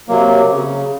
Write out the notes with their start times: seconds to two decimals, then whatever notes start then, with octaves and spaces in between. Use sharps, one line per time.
0.08 C3 F#3 A#3
0.51 C#3